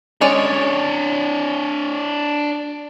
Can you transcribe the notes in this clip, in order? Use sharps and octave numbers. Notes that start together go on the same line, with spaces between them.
G#3 C#4 D4 C#5 D5